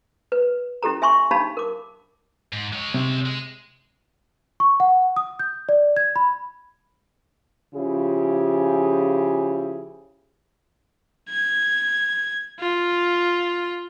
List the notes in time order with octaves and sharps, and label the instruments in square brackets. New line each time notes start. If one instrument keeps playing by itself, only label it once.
[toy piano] B4
C#4 E4 G4 A4 A#5
E5 G#5 C6 C#6
D4 D#4 G4 F5 A5 B5
A#4 D6
[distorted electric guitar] G#2
G#3 C#5
[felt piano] C3
[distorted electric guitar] G#3 G#4
[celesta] C#6
F#5
D#6
G6
D5
G#6
B5
[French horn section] C#3 F3 E4 F4 G4 G#4
[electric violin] G#6
F4